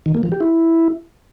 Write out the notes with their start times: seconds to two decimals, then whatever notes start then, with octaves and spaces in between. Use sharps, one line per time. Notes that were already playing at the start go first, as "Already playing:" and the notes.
0.06 D#3
0.15 A#3
0.23 F3
0.32 G4
0.40 E4